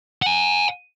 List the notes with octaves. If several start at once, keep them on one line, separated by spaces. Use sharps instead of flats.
F#5 G#5